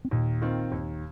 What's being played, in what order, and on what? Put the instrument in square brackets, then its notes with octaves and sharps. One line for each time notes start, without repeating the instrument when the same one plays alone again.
[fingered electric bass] C4
[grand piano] D#2 [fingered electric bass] A#2 A#3
[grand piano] D#3 C4 F4
D#2